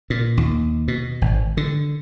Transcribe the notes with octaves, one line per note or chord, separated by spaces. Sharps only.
A#2
D#2
B2
G#1
D3